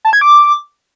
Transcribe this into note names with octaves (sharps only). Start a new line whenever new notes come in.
A5
G#6
D6